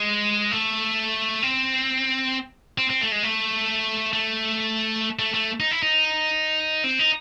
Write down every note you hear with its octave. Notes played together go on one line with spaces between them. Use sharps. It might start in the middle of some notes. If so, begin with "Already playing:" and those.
Already playing: G#3
A3
C4
C4
C4
A3
G#3
A3
A3
A3
A3
D#4
E4
D#4
C4
D#4